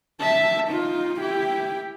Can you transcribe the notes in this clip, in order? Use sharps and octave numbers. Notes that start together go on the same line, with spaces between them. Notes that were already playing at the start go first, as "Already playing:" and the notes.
E5 A5
D#4 F4
E4 G4